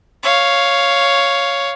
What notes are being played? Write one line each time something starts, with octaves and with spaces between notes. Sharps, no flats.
C#5 F5